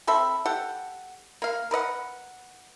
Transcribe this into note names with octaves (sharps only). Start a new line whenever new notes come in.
C4 A4 E5 B5
G4 A4 F#5
A#3 F5
A#4 B4 D#5 F#5